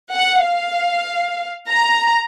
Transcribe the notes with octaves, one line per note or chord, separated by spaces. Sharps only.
F#5
F5
A#5